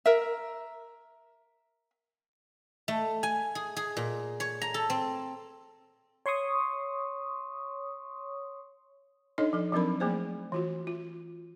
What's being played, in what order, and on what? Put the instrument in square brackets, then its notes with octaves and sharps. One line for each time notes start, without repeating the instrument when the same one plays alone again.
[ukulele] A#4 E5
[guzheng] A3
G#5
G#4
G#4
A#2
C#5
A#5
A4
C4
[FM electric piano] C#5 C6 C#6 D#6
[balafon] D4 D#4 A4 C#5 D#5
F3 A4
F3 F#3 C4 D4 A#4 B5
F3 A3 A#3 G#4 C5
E3 F4 F#4
F4